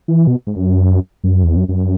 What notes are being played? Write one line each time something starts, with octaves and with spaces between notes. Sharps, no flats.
E3
B2
G#2
F#2
F#2
E2
F#2
F#2